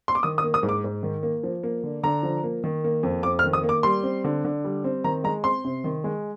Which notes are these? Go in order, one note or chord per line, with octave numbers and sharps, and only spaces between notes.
C6
D6
D#3 D#6
D#6
A#3
D#6
G#2
D6
G#2
D#3
A#3
F3
A#3
D3
D3 A#5
F3
A#3
D#3
A#3
F2
F2 D6
F6
D#3
D#6
A#3
D6
G3 C6
C4
D3
D3
G3
C4
D#3 A#5
G#3 A#5
C4 C6
C3
D#3
G#3